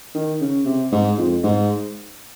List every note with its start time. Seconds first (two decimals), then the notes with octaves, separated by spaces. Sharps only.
0.15 D#3
0.41 C#3
0.66 C3
0.93 G#2
1.18 F2
1.44 G#2